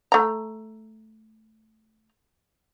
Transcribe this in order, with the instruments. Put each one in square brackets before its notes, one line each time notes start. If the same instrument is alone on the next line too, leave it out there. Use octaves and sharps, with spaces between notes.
[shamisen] A3 A#5